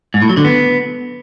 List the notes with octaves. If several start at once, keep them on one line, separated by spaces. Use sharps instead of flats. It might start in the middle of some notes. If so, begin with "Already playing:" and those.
G#2
A2
F#3
D3
B3